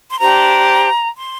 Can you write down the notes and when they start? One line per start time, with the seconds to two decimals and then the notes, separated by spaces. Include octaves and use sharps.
0.11 C6
0.20 D4 G4 C5 A#5
1.17 C6